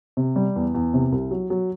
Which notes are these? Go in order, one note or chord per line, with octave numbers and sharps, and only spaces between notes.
C3
G3
E2
E2
C3
C2
F#3
F#3